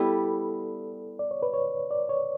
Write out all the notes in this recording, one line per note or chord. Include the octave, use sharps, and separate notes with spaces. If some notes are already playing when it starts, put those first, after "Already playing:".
Already playing: G3 B3 E4 A4
D5
C#5
B4
C#5
D5
C#5